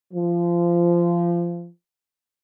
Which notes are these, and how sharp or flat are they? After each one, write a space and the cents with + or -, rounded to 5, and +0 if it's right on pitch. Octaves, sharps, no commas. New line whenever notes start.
F3 -20